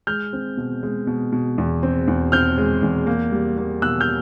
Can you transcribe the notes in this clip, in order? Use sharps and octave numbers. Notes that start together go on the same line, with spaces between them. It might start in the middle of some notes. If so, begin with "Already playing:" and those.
G#3 F6 G6
C4
B2
G#3
B2
B2
E2
C4
E2
C4 F6 G6
G#3
E2
A#3
G3
A#3
B2 E6 F#6
F6 G6